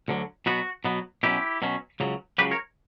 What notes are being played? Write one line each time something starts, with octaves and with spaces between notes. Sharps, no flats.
D2 D3 F#3
B2 F#3 B3 F#4
B2 F#3 B3
B2 F#3 C#4 E4 G4
B2 F#3 C#4
C#2 C#3 F#3
C#2 C#3 F#3 G4 B4
A#4 C#5